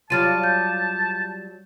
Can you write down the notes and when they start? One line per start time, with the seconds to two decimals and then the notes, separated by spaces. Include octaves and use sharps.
0.10 F#3 G3 F4 A5 F6 A6 D#7
0.44 G6